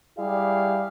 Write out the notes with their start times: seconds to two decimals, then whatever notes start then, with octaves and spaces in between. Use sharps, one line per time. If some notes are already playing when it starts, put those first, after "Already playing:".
0.18 G3 E4 G4 G#4 D5 F5